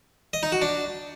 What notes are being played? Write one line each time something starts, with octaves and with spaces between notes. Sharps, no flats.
D#5
D#4
F#4
D4